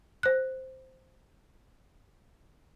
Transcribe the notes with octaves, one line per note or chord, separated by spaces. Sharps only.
C5 F#6